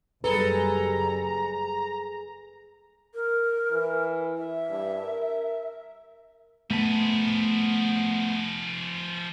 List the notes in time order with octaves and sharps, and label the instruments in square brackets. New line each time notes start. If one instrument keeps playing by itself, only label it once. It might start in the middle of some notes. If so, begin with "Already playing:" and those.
[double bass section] F#1 F#2 G3 [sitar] G#4 A4 [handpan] B4 [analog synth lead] A#5
[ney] A#4
[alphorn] E3
[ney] E5
[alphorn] G2
A#4
[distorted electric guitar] F3 G#4 [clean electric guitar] A3 B3 A5